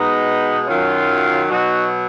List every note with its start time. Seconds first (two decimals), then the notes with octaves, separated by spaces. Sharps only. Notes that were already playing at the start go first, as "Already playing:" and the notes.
Already playing: B2 G#3 B3 D#4
0.67 F#2 D#3 F#3 C#4 F4
1.50 B2 F#3 D#4 F#4